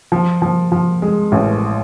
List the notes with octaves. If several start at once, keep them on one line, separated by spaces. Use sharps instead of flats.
F3
F3
F3
G#3
A1